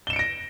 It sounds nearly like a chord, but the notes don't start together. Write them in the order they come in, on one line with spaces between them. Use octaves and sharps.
G7 E7 C#7 D7 A#6